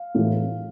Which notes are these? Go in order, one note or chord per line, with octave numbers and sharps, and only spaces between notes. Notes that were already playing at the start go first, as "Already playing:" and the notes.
Already playing: F5
A2 E3